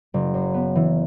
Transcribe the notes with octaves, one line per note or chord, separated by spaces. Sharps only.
F#1
F#2
B3
E3